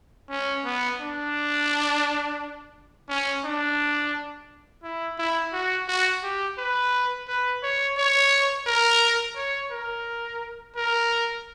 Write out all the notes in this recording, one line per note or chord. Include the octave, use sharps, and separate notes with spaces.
C#4
B3
D4
C#4
D4
E4
E4
F#4
F#4
G4
B4
B4
C#5
C#5
A#4
C#5
A#4
A#4